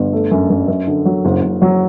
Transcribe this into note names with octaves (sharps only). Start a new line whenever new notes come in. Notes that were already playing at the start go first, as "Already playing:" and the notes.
Already playing: G1
A3
F#2
F#2
F#2
D3
F#3
F#1
F#1
F#3